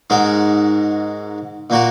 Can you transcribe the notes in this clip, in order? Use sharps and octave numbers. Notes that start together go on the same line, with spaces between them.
G#2 G#3 F#4 A#4
A#2 A#3 F#4 A#4